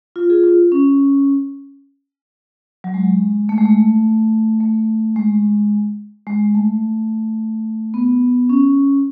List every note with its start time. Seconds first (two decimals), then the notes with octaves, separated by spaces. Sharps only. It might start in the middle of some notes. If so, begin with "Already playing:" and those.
0.16 F4
0.30 F4 G#4
0.44 F4
0.72 C#4
2.84 F#3
2.94 G#3
3.49 A3
3.58 G#3
3.66 A3
4.60 A3
5.16 G#3
6.27 G#3
6.55 A3
7.94 B3
8.49 C#4